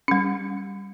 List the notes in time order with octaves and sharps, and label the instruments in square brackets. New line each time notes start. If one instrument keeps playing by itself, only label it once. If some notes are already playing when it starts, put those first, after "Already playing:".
[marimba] G3 C#4